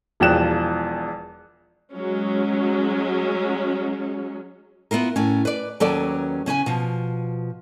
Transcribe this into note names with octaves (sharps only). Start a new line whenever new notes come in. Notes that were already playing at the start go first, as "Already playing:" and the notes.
E1 E2 F3 G5 F#6 E7
F#3 G#3 C#4
B3 E4 F4 A#4
A2 C#4
B4 D5
D#2 F#3 C#4 A4 B4 D5
C#3 C#4 B4 G#5
B2 F3